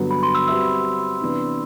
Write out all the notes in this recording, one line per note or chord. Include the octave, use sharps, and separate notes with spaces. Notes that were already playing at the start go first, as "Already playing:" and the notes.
Already playing: G2 D3 F#3 B3
B5
C6
E6
G3 C4 F#4 B4 E5 E6
C3 E3 B3 D4